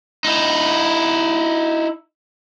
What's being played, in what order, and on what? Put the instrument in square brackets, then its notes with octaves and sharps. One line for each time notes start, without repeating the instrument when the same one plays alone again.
[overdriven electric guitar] D#4 E4